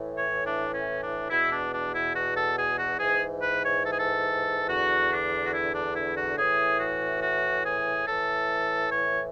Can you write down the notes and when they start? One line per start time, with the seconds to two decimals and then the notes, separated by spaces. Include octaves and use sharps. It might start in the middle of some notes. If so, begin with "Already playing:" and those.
Already playing: A2 E3
0.18 C#5
0.46 D4
0.74 C#4
1.03 D4
1.31 E2 B2 E4
1.52 D4
1.73 D4
1.95 E4
2.15 F#4
2.36 A4
2.58 G#4
2.79 F#4
3.00 G#2 E3 G#4
3.41 B4
3.63 C#5
3.85 A4
3.92 G#4
3.99 A4
4.68 E2 D3 F#4
5.11 D4
5.44 F#4
5.53 E4
5.74 D4
5.96 E4
6.16 F#4
6.38 A2 E3 G#4
6.80 F#4
7.22 F#4
7.65 G#4
8.06 A2 E3 A4
8.91 C#5